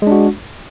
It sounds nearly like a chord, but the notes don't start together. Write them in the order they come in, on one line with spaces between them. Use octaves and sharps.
G#3 D4 F#4